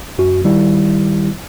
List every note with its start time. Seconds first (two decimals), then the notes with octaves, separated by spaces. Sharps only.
0.18 F#2 F#4
0.44 D#3 G3 E4